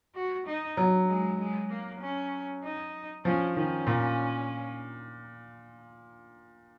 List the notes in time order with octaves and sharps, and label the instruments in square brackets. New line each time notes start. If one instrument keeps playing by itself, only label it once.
[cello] F#4
D#4
[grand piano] F#3
[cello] G#3
G#3
A#3
C#4
D#4
[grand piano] F3 [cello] C#4
[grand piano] D#3 [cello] C#4
[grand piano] A#2